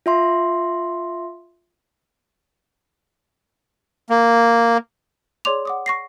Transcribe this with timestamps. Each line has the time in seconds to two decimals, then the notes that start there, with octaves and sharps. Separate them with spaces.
0.06 F4 E5 C6
4.10 A#3
5.45 G#4 C#5 D5 C6 D6 F7
5.65 F#5 D6 D#6
5.86 C#6 A#6 C7